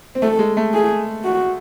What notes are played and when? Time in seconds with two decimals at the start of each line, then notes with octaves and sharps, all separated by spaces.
0.15 C4
0.22 A3 A4
0.39 G#3
0.57 A3
0.74 G#4
1.24 F#4